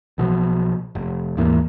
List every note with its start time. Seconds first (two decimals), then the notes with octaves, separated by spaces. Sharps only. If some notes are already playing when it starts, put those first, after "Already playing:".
0.18 B1 B2 E3 F3
0.95 F1
1.37 D#2 G#2 E3 A#3